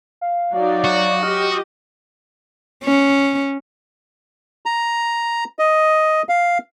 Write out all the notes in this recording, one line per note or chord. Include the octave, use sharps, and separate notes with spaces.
F5
F#3 D#4 D5 F5
F#4
G4 D#5 F6
C#4
A#5
D#5
F5